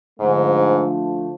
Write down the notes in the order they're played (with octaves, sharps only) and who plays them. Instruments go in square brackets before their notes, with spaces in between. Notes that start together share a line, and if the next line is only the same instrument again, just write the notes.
[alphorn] G#2 [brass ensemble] D3 F3 A3